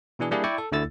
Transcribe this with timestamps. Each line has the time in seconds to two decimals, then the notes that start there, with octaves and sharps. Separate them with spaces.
0.19 B2 E3 D4 G#4
0.31 G3 A#3 D4 E4 G#4
0.44 E4 D5 G5 C#6
0.58 A4
0.72 D2 D3 A3 E4 E6 A6